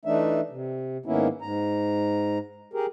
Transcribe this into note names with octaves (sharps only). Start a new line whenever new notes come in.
E3 A3 D4 D#4 E5
C3
G#2 D#3 A#3 B3 C#4 E4
G#2 A#5
G4 G#4 A#4